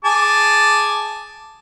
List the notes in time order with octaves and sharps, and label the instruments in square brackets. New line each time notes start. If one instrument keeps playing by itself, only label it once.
[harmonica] G#4 A5 D6